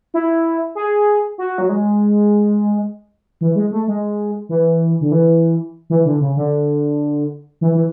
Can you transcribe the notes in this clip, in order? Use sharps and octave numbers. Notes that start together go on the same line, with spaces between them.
E4
G#4
F#4
F#3
G#3
E3
G#3
A3
G#3
E3
D3
E3
E3
D3
C#3
D3
E3
E3